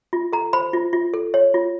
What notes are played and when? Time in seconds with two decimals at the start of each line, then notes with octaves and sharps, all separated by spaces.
0.13 F4
0.33 A4 A#5
0.53 C5 B5
0.73 F4
0.93 F4
1.14 A4
1.34 C#5
1.54 F4